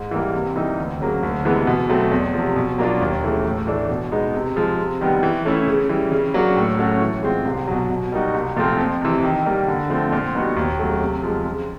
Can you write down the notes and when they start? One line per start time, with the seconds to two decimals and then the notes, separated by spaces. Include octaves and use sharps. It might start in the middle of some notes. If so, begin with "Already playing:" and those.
Already playing: G#2
0.11 E3 G3 A#3
0.33 C3
0.56 E3 G3 A#3 D#4
0.78 D2
1.00 C#3 F#3 A#3
1.23 D2
1.45 C3 E3 G#3 B3
1.67 B2
1.89 F#3 A3 C4
2.11 E2
2.33 C3 F3
2.56 B2
2.78 F#3 A#3 D4 F4
3.01 D#2
3.23 C#3 E3 A3
3.45 A2
3.67 E3 A3 D4
3.89 B2
4.12 G#3 B3 D#4
4.34 C3
4.56 F3 G#3
4.78 C3
5.01 D#3 G3 B3
5.23 E3
5.45 A3 C#4 E4
5.67 C#3
5.89 E3 G3
6.12 C#3
6.34 F#3 A#3 D4 F#4
6.56 A2
6.78 F#3 A3 C#4 F#4
7.01 E3
7.23 G#3 C4 F4
7.45 C2
7.68 B2 F#3
7.90 B2
8.12 G3 A#3 D#4 F#4
8.34 C2
8.57 A#2 F3 A3 C4
8.79 F2
9.02 C3 E3
9.23 D#3
9.46 G3 A#3
9.68 D3
9.90 F3 A3 C4
10.12 A#2
10.35 G3 B3 D#4 F#4
10.57 D#2
10.79 C#3 F#3 A3
11.01 C3
11.23 F3 G#3
11.46 C#3